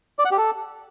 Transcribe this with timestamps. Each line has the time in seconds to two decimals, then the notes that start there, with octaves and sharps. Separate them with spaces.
0.19 D5
0.25 F#5
0.31 G4
0.38 A4